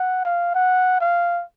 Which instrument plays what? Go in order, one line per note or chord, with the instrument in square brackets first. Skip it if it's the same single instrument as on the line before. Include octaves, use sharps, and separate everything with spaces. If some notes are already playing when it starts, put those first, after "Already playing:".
Already playing: [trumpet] F#5
F5
F#5
F5